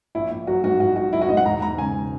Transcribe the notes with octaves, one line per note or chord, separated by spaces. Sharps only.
A#1 E4
A#1
F#3 F#4
G#2 F#4
A#1 F#4
A#1 F#4
F#3 E4
F#4
G#2 D#5
F#5
E1 A#5
E1 A#5
C#3 G#5